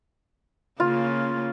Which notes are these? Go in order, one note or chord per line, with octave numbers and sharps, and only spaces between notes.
C#3 A#3 C#4 F4